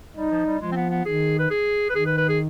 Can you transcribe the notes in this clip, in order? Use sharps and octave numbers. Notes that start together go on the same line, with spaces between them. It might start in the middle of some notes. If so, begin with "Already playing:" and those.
G3 D#4
F3
G3
F3 G#3
C4
B3
B3
D#3 G#4
B4
G#4
B4
D#3 G#4
B4
B4
G#4